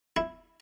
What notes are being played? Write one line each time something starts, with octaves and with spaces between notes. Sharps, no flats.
E4